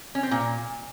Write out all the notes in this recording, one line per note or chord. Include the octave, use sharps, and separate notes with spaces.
C#4
C4
A#2